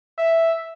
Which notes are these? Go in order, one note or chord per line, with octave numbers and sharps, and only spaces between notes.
E5